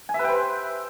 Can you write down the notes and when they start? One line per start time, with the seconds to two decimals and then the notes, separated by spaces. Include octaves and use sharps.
0.09 G#5
0.14 E5
0.19 B4
0.24 G5
0.29 C5